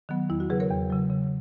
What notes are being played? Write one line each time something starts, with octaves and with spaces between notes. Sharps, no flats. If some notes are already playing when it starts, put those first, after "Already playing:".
D#3 F#3 B3
E2 E4
F#4
C#3 F#3 G#4 B4
A#4 C#5
E2
C#3 F#3
C#3